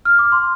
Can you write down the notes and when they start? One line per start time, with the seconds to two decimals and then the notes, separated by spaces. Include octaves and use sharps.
0.05 F6
0.19 D6
0.32 C6